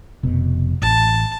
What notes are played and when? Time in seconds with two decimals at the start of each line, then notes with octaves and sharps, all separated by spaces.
0.23 F1 B2
0.82 A1 A5